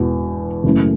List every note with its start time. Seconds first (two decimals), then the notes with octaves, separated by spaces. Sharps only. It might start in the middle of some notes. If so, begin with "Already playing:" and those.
Already playing: E1 E2 B2
0.64 F#1 F#2 E3 A3